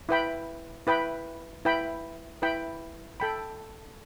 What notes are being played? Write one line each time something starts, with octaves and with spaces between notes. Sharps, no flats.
E4 B4 G5 B5
E4 B4 G5 B5
E4 B4 G5 B5
E4 B4 G5 B5
A4 G5 B5